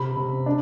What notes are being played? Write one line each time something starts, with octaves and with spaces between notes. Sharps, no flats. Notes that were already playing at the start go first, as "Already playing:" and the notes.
Already playing: C3 B5
C3
D4